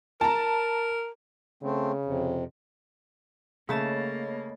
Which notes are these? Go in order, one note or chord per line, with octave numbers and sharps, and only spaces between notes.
A#4 A5 A#5
C#3 A3 C4
F2 C3
C#3 A3 A#3 C#5 D#5 B5 A6 E7